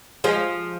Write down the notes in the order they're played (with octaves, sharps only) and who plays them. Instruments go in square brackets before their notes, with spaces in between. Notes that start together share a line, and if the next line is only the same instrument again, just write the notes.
[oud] F3 G#3